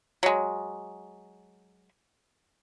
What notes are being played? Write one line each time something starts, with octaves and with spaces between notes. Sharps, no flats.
F#3 G#3